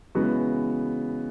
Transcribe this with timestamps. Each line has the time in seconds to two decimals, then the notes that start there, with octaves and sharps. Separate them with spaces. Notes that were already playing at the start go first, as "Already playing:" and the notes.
0.15 C#3 E3 G#3 B3 F#4